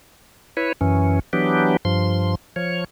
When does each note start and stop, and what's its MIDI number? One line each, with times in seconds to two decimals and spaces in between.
0.57 0.72 64
0.57 0.72 71
0.57 0.72 73
0.81 1.19 42
0.81 1.19 52
0.81 1.19 61
1.33 1.77 52
1.33 1.77 54
1.33 1.77 59
1.33 1.77 62
1.33 1.77 67
1.85 2.35 43
1.85 2.35 53
1.85 2.35 84
2.56 2.84 53
2.56 2.84 73